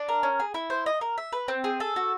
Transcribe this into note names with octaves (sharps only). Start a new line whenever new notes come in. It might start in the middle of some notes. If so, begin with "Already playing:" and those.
Already playing: D4
A#4
C#4
G#4
E4
C5
D#5
A#4
E5
B4
C4
G#4
A4
F#4